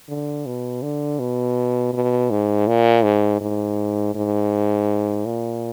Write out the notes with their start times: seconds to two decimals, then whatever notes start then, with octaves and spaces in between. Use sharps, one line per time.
0.09 D3
0.46 B2
0.82 D3
1.19 B2
1.93 B2
2.30 G#2
2.67 A#2
3.04 G#2
3.41 G#2
4.15 G#2
5.26 A#2